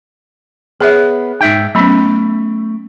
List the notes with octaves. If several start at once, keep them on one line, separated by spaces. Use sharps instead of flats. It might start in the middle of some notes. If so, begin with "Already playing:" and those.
B3 G#4 C#5 E5
G#2 D#4 E5 G5
F#3 A3 B3 C#4 B5